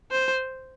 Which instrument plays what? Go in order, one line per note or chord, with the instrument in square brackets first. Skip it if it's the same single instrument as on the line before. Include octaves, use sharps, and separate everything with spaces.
[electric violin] C5